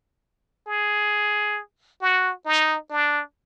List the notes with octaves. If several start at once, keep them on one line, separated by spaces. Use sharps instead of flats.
G#4
F#4
D#4
D4